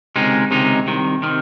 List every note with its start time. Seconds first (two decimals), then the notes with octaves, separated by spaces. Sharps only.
0.16 C#2 C3 D#3 G#3 D#4
0.51 C#2 C3 D#3 G#3 D#4
0.87 C2 C3 D#3
1.22 C3 D#3